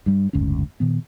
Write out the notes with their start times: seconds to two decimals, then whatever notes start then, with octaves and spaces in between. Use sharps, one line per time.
0.06 G2 G3
0.33 F#1 D2 G#2 C#4
0.80 A#2 D#3 B3